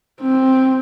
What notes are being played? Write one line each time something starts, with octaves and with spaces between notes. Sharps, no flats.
C4